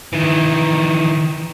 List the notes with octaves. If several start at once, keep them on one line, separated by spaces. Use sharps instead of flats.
D#3 E3